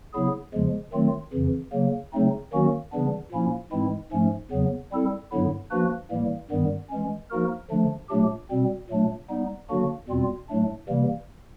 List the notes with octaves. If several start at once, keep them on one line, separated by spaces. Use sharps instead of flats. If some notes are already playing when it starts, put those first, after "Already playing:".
C#3 F#3 B3 E4 G#4
E2 C#3 F3 G#3
D#3 F#3 A3 C4 F4
F2 C#3 E3
C#3 F#3 A#3
C#3 F#3 A3 C4 D#4
D#3 F#3 A#3 C#4 F#4
C#3 E3 G3 B3 D4
A#2 F3 A#3 C#4 E4
G#2 E3 G#3 C4 E4
G#2 F3 A3 C#4
E2 C#3 F#3 B3
G3 C4 E4 A4
G2 D3 F#3 B3 E4
F3 A#3 D4 F#4 B4
A2 E3 G3 A#3
G2 D#3 G3 B3
E3 G#3 C#4
F3 A#3 D#4 F#4 A#4
D3 F3 A3 D4
A#2 F#3 A3 D4 G4
B2 G3 C4
A#2 F#3 A3 D4
G3 B3 D#4
D3 F#3 A#3 D4 F#4
E2 B2 G3 C4 F4
A2 F#3 A3 D4
C3 E3 G3 A#3